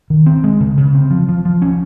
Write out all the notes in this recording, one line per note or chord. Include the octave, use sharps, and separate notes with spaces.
D#3
C4
G#3
C#3
C#3
C4
F3
F3
F3
C#4